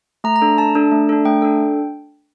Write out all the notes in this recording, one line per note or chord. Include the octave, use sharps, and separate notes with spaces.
A3 A#5
A#5
D4 A4
A3 A5
D4 A4
A3
D4 A4
A3 G5
D4 A4